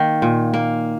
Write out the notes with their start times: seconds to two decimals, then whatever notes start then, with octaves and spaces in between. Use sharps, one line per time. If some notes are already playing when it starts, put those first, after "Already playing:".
Already playing: D#3 A#3
0.22 A#2
0.54 A#3